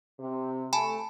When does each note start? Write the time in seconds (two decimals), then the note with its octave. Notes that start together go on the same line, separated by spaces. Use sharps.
0.19 C3
0.73 A3 G#5 A5 B5